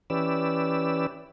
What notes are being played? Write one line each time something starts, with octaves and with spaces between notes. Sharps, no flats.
E3 C#4 G4 B4 D5 E6